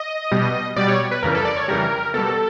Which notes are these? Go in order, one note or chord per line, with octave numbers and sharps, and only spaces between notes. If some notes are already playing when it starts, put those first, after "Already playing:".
Already playing: D#5
B2 G3
B2 G3 D5
C#5
B4
F2 C#3 E3 G3 A#4
A4
D5
C#5
F2 C#3 E3 G3 A#4
B2 G3 A4